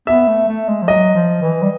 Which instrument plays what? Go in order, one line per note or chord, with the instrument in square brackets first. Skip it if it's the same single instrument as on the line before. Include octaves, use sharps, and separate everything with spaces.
[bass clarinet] B3 [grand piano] E5
[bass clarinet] A3
A3
G#3
F3
[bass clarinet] F#3 [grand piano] D#5
[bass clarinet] F3
E3
G3